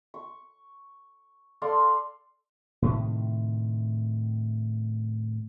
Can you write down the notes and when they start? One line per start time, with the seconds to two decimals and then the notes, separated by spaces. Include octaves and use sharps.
0.14 C#6
1.62 A4 D5 F5 C6
2.82 A2 C3 D#3